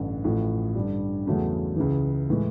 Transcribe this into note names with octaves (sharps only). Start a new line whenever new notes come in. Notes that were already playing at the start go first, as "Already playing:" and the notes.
Already playing: A1 G2 D3
A1 A2 F3
G2 D3 G3
E2 C#3 F#3 A3 C#4
C#2 C#3 E3
A2 E3 G#3